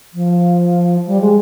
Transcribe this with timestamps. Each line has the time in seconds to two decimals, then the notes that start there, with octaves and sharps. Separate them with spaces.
0.13 F3
1.06 G3
1.20 G#3